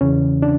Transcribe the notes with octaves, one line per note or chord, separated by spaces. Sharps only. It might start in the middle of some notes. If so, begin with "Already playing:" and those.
E2 C#3 E3 C#4
D4